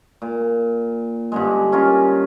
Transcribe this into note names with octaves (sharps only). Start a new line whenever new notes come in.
A#2
G2 D3 G#3
C#4 F4 A#4